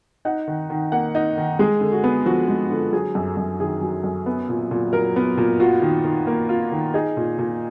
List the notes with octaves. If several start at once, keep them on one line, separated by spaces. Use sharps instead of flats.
D#4 F#5
D#3
D#3
A#3 F#5
D#4
D#3
G#3 G#4
D3
F#4
B3
F3 F#4
G#3
D3
F#3 G#4
F#2
F#2
D#3 G#4
F#3
F#2
B3
A#2
A#2
F#3 A#4
B3
A#2
F4 F#4
D#3
D#3
A#3
F4
D#3
D#4 G#4
A#2
A#2